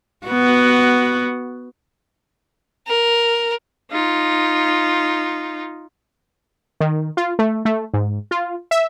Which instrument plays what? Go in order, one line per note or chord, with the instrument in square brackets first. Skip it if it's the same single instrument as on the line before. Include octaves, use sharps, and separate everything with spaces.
[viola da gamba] B3 F#4
[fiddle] A#4
[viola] D#4 F4
[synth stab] D#3
F4
A3
A3
G#2
F4
E5